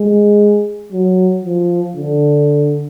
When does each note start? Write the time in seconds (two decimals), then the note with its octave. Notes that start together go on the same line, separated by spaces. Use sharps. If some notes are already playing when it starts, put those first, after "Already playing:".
Already playing: G#3
0.92 F#3
1.45 F3
1.96 D3